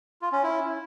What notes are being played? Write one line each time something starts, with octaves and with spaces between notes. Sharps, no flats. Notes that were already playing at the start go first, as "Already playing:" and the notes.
F4
C#4
E4